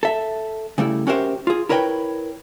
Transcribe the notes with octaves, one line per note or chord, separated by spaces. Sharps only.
A4 E5
C#3 G3 A3 E4
C#4 F#4 G4 A#4 C5 E5
F4 G#4
E4 A#4 B4 C#5 D#5 G5